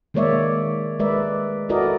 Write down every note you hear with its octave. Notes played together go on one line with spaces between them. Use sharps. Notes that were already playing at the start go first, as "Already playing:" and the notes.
D#3 G#3 A#3 C#5 D5 E5
G#3 A3 A#4 B4 D5 E5
E4 F#4 A4 A#4 D5 D#5